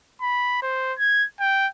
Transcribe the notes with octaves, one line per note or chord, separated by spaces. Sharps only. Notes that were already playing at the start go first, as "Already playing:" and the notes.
B5
C5
G#6
G5